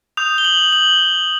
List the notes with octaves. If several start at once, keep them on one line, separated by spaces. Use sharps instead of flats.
D#6 G6 F7
G7
F#7
F#7